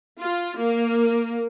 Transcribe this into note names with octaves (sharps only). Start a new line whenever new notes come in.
F4
A#3